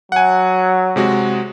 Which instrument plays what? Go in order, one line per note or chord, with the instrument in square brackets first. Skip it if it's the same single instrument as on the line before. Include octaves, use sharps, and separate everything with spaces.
[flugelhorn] F#3 [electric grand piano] F#5 G#5
[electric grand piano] C3 G#3 F#4